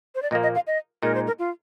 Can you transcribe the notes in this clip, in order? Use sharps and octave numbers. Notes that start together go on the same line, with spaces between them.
C5
D5
A#2 F3 A#3 D#5
D#5
F5
D#5
A#2 G#3 D#4 A#4
C5
A#4
F4